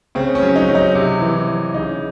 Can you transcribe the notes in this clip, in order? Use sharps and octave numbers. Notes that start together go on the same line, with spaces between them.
C#3 C4
C#4
F#3
D#4
F#3
D#4
C3
E3
E3
C#3 D#4